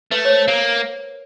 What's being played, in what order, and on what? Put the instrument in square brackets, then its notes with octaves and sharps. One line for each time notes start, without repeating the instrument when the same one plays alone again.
[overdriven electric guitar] A3 [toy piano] B4
[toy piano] C#5
C5
[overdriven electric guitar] A#3 [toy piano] A#4